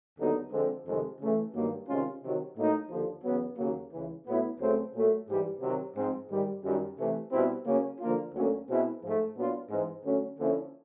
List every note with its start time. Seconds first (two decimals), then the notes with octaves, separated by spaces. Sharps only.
0.17 D#2 D3 F#3 B3 D#4
0.51 D3 F3 G#3 C4
0.86 F2 C3 D#3 G#3
1.19 C#3 E3 A3
1.54 G2 D#3 F#3 A#3
1.87 C3 D#3 G#3 C#4 F4
2.22 C3 D#3 F#3
2.55 A2 F#3 A#3 D#4
2.90 D#2 D3 F3
3.23 E2 C#3 F#3 B3
3.57 D#2 C#3 F#3 A#3
3.91 C#2 C#3 E3
4.25 A2 F#3 B3 E4
4.59 C#2 C#3 F#3 A3 C4
4.93 A#2 F#3 A3
5.27 G#2 E3 G3
5.61 C3 D#3 F#3
5.95 G#2 F3 G#3 C4
6.30 G#2 D#3 G3
6.63 F#2 D#3 G3
6.97 C3 E3 A3
7.31 B2 G3 C4 E4
7.65 C#3 F#3 A#3 C#4
7.99 D3 F3 A#3 D4 F4
8.33 D2 D3 F#3 A#3 C#4
8.67 B2 G#3 C4 E4
9.01 G#2 F3 A3
9.35 A#2 F#3 B3 D4 F4
9.69 G#2 E3 G#3 C4
10.03 D3 F#3 A3 C#4
10.37 D3 F3 A#3 C#4 E4